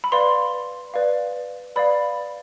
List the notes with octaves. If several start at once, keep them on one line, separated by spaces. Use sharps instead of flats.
B5
B4 D5 F5 C6
B4 D5 F5
B4 D5 F5 B5